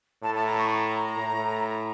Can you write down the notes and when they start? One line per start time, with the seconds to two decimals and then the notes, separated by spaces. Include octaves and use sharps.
0.23 A2 A5
0.34 A5
0.46 A#5
0.58 C#6
0.70 A#5
1.17 A2